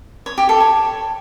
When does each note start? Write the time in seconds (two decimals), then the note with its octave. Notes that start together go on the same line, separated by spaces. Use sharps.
0.26 C#5
0.38 G4
0.49 A4
0.60 C#5